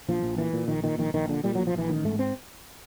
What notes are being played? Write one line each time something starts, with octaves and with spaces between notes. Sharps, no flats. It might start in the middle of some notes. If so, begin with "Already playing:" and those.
A#1 F3
A#1
A#2 E3
A#2
A#1 D#3
A#2 D#3
A#1 D#3
A#1 D#3
A#2 D3
A#2 G3
A#1 F#3
F3
A#1 E3
A1 D#3
G#2 A3
C4